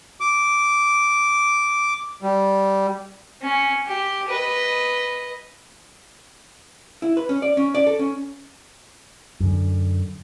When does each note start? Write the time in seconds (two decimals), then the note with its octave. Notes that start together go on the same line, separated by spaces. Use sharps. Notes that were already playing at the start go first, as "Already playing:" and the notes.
0.21 D6
2.22 G3
3.42 C#4
3.87 G4
4.28 B4 D#5
7.02 E4
7.17 B4
7.29 C#4
7.42 D5
7.57 C#4
7.75 D5
7.87 A4
7.99 C#4
9.40 F#2 D3